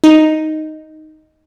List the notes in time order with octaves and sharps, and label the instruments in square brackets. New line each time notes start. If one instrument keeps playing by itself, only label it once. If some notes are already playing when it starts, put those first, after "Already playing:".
[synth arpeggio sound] D#4